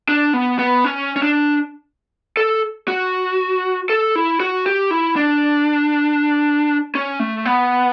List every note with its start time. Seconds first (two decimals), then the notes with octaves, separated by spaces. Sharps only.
0.09 D4
0.33 B3
0.59 B3
0.84 C#4
1.16 C#4
1.22 D4
2.37 A4
2.88 F#4
3.90 A4
4.16 E4
4.40 F#4
4.66 G4
4.91 E4
5.16 D4
6.95 C#4
7.20 A3
7.45 B3